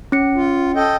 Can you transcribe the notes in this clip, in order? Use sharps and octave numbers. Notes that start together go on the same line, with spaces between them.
C#4 C#7
F4
A4 D#5 G5